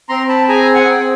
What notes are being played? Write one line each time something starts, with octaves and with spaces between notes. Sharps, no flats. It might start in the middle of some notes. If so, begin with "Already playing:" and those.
C4 A#5 C6
A5 B5
G#4 G#5 A#5
F#5 G#5
C4 G5